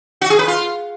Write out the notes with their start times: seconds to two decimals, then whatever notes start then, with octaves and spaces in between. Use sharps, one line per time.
0.21 F#4
0.30 G#4
0.39 B4
0.48 F4